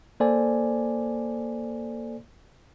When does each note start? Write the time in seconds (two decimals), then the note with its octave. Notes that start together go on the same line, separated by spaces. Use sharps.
0.20 A#3 A4 C5 D5 G#5